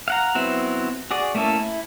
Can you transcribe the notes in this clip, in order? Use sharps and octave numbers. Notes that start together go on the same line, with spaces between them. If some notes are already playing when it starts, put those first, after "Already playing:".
F5 F#5 A#5
F#3 B3 C4 E4 F#4
F#4 G#4 D5
A3 A#3 C#4 E4 A4
E4